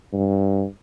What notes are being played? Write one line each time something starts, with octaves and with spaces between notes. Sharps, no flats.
G2